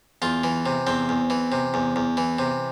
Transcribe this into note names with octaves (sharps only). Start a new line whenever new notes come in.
E2 F4
E3
C3
E2 C4
E2
E3
C3
E2
E2
E3
C3